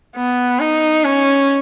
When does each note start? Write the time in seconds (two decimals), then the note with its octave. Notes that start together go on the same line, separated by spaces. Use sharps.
0.16 B3
0.60 D#4
1.05 C#4